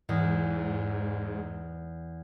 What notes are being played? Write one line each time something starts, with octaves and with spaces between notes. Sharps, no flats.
E2 G#2